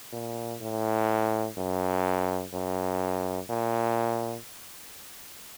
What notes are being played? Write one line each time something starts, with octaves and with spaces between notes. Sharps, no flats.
A#2
A2
F#2
F#2
A#2